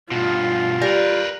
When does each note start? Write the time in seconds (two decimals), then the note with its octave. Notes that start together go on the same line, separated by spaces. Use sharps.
0.11 G2 B2 F4
0.82 G3 A#4 B4